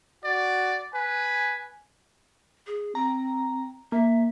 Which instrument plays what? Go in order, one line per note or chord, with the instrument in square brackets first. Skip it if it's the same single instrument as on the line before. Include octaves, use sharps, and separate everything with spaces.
[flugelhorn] F#4 [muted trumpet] D5
[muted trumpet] B4 [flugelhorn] G#5
[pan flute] G#4
[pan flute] C4 [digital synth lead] A#5
[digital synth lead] A#3 [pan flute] E5